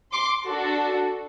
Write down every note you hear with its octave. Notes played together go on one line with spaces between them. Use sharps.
C6 D6
D4 F#4 A4